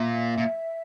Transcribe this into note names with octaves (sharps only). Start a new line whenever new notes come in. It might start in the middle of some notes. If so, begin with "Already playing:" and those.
Already playing: A#2 E5
A#2